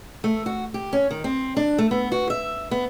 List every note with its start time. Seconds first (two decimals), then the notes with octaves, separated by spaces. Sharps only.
0.24 A3
0.46 F#4
0.74 G4
0.93 C#4
1.11 D#3
1.24 C4
1.57 D4
1.78 A3
1.91 B3
2.12 F#4
2.30 E5
2.71 B3